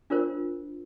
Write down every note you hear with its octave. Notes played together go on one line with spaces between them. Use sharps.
D4 F4 A#4 C5